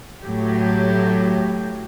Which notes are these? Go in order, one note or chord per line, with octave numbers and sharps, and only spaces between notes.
A2 F#3 G4